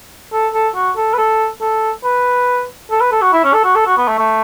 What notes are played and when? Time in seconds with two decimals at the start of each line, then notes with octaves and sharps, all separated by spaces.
0.33 A4
0.54 A4
0.75 F#4
0.97 A4
1.14 B4
1.18 A4
1.61 A4
2.04 B4
2.90 A4
3.01 B4
3.12 A4
3.22 F#4
3.33 E4
3.44 C#4
3.54 A4
3.64 F#4
3.75 A4
3.86 F#4
3.97 B3
4.08 A3
4.19 A3